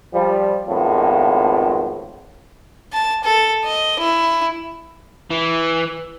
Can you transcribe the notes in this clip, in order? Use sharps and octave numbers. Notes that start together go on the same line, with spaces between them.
F3 G3
G#1 F2 A2 B3 F4
A5
A4
D#5
E4
E3